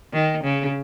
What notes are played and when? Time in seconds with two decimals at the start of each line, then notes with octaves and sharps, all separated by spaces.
0.13 D#3
0.44 C#3